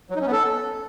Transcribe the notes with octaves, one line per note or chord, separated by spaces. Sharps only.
F#3
D#4
C#4
B3
A4